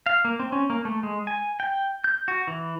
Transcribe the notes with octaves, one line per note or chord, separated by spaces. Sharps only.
F5
A#3
C4
C#4
A#3
A3
G#3
G#5
G5
G6
F#4
E3